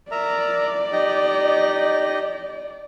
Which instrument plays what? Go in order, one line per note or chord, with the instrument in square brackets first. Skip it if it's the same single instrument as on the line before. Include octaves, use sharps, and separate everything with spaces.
[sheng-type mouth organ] A#4 E5 A#5 [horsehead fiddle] D5
[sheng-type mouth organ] D#4 G4 D#5